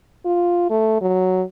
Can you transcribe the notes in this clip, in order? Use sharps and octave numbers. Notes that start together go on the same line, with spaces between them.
F4
A3
F#3